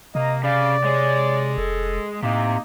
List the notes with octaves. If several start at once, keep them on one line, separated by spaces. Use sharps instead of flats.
C3 A#3 D#5 A#5
C#3 D5 F5
G#3 G#4 C#5
F1 A4
A2 C3 A#3 D#4